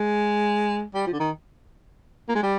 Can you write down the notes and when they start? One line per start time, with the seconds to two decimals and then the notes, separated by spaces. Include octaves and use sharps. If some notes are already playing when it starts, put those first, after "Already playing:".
Already playing: G#3
0.94 G3
1.07 F3
1.13 D3
1.20 D#3
2.29 A#3
2.35 G#3
2.43 G3